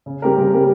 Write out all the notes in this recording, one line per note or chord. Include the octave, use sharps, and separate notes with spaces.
C#3
G3 C4 G4 A#4
C#3
G3 C4 G4 A#4